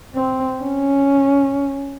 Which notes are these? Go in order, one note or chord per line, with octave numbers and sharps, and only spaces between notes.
C4
C#4